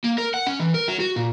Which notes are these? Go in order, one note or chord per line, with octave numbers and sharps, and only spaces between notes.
A#3
A#4
F#5
C#4
E3
A#4
F#3
F#4
A#2